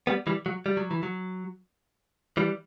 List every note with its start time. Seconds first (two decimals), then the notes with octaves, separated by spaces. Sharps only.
0.07 G3 B3
0.27 E3 G3
0.46 F#3
0.66 G3
0.77 F#3
0.91 E3
1.03 F#3
2.37 E3 G3